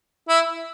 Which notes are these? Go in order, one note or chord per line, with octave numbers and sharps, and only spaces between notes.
E4